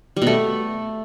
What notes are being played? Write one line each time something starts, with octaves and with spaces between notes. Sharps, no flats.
G3
B2
A3